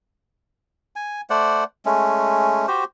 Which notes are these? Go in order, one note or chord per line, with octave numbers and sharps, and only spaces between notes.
G#5
A3 C5 D5 F#5
G#3 A3 C#4
F#4 G4 C5